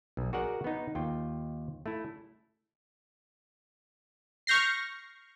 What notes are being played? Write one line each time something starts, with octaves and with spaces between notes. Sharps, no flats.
B1
F#4 G#4 A#4 D5 F#5
B3 D#4
D#2 F4 G5
A3 E4
C#6 F6 G6 A#6 C7